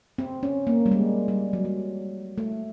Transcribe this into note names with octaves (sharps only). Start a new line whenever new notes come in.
C4
C#4
A#3
G3
G#3
G3
F#3
G3
A3